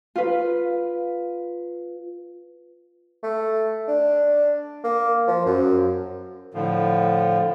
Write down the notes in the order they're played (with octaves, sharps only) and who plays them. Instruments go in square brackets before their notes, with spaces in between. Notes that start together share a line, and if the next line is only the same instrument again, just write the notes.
[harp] F4 B4
[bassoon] A3
D4
A#3
F3
F#2
[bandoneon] A2 D3 F3